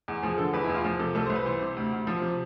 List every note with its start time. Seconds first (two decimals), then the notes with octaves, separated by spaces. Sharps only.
0.08 E2
0.23 F3 G#4
0.38 D3 A4
0.53 E2 B4
0.64 E4
0.69 E2
0.75 F4
0.85 F3
0.99 C3 A4
1.15 C2 A4
1.26 C5
1.30 C2
1.35 B4
1.45 E3 C5
1.61 C3
1.77 D2
1.93 D2
2.07 F3
2.22 C3